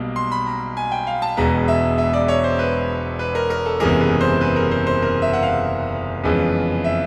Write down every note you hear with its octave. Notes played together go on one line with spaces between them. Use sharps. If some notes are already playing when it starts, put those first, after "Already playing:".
Already playing: B1 B2 G3 A#3
C6
B5
A#5
G#5
G5
F5
A5
E1 E2 B2 G#3 B3 A#5
E5
E5
D5
C#5
C5
B4
B4
A#4
A#4
A4
F#1 E2 C3 E3 G#3 A#4
B4
C5
B4
A#4
C5
C5
A#4
E5
F#5
F5
F2 C#3 E3 G#3 B3
E5